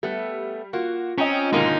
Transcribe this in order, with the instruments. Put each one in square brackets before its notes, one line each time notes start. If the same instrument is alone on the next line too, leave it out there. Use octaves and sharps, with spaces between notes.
[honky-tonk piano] G3 [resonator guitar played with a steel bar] A3 B3
[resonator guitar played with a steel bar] A#3 [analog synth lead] F4 [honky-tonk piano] F#4
[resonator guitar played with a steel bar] C4 [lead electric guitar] C#4 [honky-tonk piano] D#5 G5 A#5
[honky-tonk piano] G#2 B2 D#3 [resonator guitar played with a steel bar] D3 A#3 C#4 [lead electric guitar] D#4